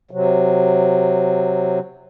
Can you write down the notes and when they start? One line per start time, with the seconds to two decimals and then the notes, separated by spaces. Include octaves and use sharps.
0.11 C3 F#3